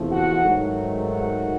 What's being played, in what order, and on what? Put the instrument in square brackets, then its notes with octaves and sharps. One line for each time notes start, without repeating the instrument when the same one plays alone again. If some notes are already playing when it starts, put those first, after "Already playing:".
Already playing: [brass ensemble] E2 C3 F3 A3
F#4 F#5
G#2 D#3 F#3 A3
F#4 F#5